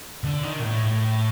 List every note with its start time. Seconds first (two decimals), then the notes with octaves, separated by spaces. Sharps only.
0.24 D3
0.43 D#3
0.59 A#2
0.63 A2
0.84 A2